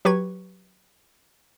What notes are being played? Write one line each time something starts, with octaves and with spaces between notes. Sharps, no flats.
F#3 G4 B4 C#6 G#6